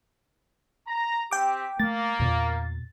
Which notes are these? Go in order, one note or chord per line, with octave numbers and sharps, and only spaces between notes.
A#5
C4 G4 G5 D6
A3 A#3 A6
E2 A#2